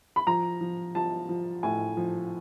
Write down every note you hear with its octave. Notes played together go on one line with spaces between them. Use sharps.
B5
F3 A#5
F3
F3 A5
F3
A2 G#5
F3